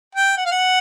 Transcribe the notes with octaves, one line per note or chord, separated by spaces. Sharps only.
G5
F#5
F5
F#5